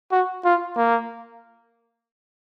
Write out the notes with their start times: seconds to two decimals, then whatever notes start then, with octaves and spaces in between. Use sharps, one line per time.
0.11 F#4
0.44 F4
0.77 A#3